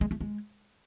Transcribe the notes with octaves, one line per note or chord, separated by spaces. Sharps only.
G#3
A3
G#3